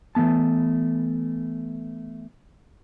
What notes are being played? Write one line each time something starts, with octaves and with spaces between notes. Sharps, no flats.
E3 A3 B3 A5